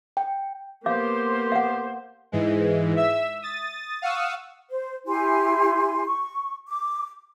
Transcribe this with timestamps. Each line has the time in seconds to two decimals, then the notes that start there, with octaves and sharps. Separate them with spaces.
0.17 G5
0.86 A#3 B3 G4 C5 F5 D6
1.52 F5 F#5
2.32 G#2 E3 G#3
2.96 E5 E6
3.42 D#6 A6
4.02 F5 F#5 C#6 D#6 E6
4.70 C5
5.07 E4 G4 G#5 C6
6.06 C#6
6.69 D6